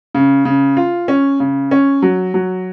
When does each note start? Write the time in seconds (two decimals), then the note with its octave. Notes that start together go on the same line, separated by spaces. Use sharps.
0.15 C#3
0.45 C#3
0.77 F4
1.08 C#4
1.40 C#3
1.71 C#4
2.02 F#3
2.34 F#3